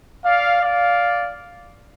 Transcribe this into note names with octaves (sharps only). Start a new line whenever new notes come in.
D5 F5
D5 F5